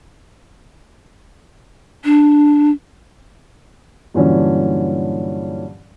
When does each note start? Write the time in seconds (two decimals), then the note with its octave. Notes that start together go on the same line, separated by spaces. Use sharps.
2.05 D4
4.14 G2 A#2 D3 E3 F#3 C#4